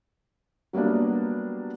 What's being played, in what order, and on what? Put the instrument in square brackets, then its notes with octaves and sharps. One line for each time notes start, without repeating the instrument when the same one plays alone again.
[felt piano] F#3 G3 A#3 B3 D4